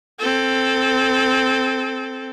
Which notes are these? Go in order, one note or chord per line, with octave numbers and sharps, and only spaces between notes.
C4 A4